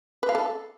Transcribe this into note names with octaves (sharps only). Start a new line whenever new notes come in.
B4
F5
A4